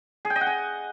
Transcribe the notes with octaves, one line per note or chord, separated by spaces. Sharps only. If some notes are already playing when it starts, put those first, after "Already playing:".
G#4
G5
D#5
F#5
G#5